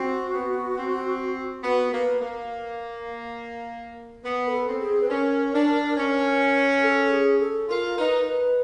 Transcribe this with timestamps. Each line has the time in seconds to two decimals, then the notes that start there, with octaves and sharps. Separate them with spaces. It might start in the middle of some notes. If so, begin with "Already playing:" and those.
Already playing: C4 F#4
0.33 B3
0.76 C4
1.63 B3 F#4
1.91 A#3 B4
2.21 A#3
4.23 B3
4.47 A#4
4.52 A4
4.66 C4
4.80 G#4
5.01 B4
5.09 C#4 A#4
5.53 D4
5.96 C#4
6.82 A4
7.11 G#4
7.40 A4
7.69 F4 A#4
7.98 D#4 B4
8.27 B4